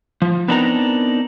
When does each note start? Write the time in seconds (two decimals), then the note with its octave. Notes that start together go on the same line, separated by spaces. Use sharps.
0.22 F3
0.48 B3 C4 D4 D#4 A#4 A#5